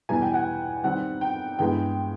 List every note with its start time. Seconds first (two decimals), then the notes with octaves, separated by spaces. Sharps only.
0.09 E2 B2 G3 B3 E4 G#5
0.22 G5
0.34 F#5
0.84 D#3 G3 C4 F#5
1.21 G5
1.58 G2 E3 G#3 B3 G5